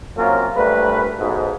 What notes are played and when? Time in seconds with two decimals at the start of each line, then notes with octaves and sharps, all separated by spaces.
0.17 C3 F#3 A#3 C#4 F4 A#4
0.56 A#1 G3 A3 A#4 B4
1.19 B1 G#2